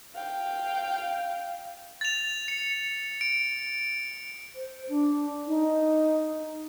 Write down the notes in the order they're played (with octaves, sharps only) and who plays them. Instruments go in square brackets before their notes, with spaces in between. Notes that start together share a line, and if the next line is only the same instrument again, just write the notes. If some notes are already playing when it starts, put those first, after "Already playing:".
[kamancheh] F5 G5
[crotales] A6 F7
C#7
D7
[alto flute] C5
D4
D#4